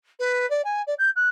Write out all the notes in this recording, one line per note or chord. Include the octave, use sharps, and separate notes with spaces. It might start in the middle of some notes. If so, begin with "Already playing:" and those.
B4
D5
G#5
D5
G6
F#6